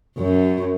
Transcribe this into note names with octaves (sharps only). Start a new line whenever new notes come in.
F#2